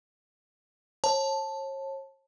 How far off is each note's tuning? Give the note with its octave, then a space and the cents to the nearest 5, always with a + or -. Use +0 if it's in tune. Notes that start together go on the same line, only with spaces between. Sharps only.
C#5 -40 A5 +0